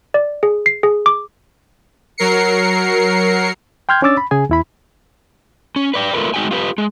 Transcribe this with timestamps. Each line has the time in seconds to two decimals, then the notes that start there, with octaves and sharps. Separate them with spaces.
0.14 D5
0.43 G#4
0.66 C7
0.83 G#4
1.06 D6
2.18 F#3 A#4 C7 C#7
3.89 G5 C6 F6 G6 G#6
4.02 C#4 D4 C#5 D6 E6 A6
4.17 B5
4.31 C#3 G#4 G#5
4.49 E2 E4 B5
5.76 C#4
5.94 B4 D5 G5
6.13 A3 F4 A#4 B4
6.34 G#3 D#4 F#4 G5 G#5
6.51 F4 G4 B4
6.78 G#3